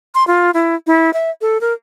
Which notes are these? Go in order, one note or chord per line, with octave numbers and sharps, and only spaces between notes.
C6
F4
E4
E4
E5
A4
A#4